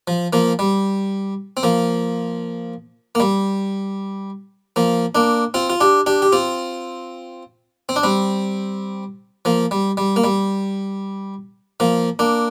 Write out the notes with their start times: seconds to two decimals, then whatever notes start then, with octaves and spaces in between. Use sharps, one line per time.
0.08 F3
0.33 F3 A#3
0.59 G3
1.57 C4
1.63 F3 A#3
3.15 A#3
3.20 G3
4.76 F3 A#3
5.15 A#3 D4
5.54 C4 F4
5.70 F4
5.81 D4 G4
6.06 D4 G4
6.22 G4
6.32 C4 F4
7.89 C4
7.96 D4
8.03 G3 C4
9.45 F3 A#3
9.71 G3
9.97 G3
10.16 A#3
10.24 G3
11.80 F3 A#3
12.19 A#3 D4